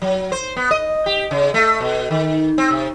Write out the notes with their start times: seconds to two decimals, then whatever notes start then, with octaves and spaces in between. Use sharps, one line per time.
0.02 F#3
0.32 C5
0.56 B3
0.71 D#5
1.06 G4
1.31 C#3
1.54 A3
1.80 B2
2.11 D#3
2.58 C4
2.71 C3